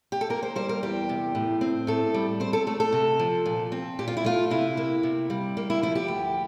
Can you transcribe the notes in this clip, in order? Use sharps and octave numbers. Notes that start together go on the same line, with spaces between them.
G4
A4
A#3 A#4
C5
G3 C5
A#4
E2 G4
C3
A2
C4
A2 A4
G3
C4 C5
A4
A3 A4
A4
C3
F3
A#2
C4
A#2 G4
F4
E4
A3 F4
C3 E4
A#3
C3
G3
A#3
E4
F3 E4
G4
D2